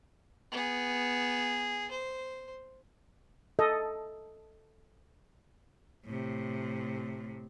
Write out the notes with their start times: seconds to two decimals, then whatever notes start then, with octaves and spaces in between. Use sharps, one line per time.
0.52 B3 G#4
1.91 C5
3.59 A4 D#5
6.05 A2 C3